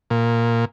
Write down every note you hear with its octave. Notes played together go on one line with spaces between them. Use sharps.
A#2